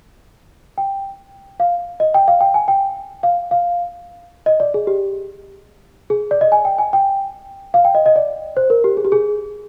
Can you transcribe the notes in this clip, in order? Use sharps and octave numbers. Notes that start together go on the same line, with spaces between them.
G5
F5
D#5
G5
F5
G5
G#5
G5
F5
F5
D#5
D5
G#4
G4
G#4
D5
D#5
G#5
G5
G#5
G5
F5
G5
D#5
D#5
D5
C5
A#4
G4
G#4
G4
G#4